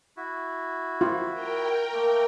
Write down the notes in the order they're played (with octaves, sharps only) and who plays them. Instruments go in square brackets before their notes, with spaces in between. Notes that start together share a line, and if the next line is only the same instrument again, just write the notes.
[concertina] E4 F#4
[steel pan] F4
[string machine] A#4 G5
[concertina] A3 A#3